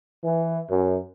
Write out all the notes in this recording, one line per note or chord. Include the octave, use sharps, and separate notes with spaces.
E3
F#2